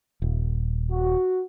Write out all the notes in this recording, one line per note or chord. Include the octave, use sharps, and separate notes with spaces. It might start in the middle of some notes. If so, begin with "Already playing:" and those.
D#1
F#4